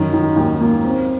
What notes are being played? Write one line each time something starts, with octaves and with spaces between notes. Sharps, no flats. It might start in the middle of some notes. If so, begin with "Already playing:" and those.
Already playing: F#2 D#3
D#3
D#2
A#3
C4